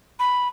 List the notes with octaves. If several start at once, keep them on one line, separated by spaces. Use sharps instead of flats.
B5